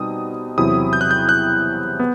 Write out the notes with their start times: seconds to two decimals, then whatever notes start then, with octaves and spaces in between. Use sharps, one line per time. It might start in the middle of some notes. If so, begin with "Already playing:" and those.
Already playing: B2 G3 C4 D#4 D#6
0.58 E2 C3 F#3 C4 E4 D#6
0.93 G6
1.01 F#6
1.11 G6
1.29 F#6
2.00 B3